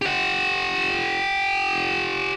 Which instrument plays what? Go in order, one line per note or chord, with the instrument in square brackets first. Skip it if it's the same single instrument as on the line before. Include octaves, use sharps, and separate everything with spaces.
[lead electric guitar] G4 F#5